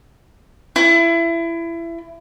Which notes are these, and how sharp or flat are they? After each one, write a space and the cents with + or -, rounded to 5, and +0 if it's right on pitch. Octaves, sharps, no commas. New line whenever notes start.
E4 +25